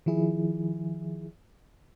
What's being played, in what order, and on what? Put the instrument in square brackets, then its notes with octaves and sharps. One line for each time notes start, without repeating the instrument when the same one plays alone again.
[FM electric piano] D#3 F3 E4 G#4